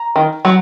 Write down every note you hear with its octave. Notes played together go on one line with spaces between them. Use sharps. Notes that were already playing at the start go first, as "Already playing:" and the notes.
Already playing: A#5
D#3
F#3